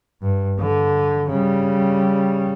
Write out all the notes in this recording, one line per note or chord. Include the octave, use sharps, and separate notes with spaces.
G2
D3
C#3 G3